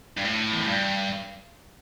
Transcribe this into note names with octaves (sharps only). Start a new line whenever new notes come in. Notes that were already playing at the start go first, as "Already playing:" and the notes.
G2
A2
E2
F2
G2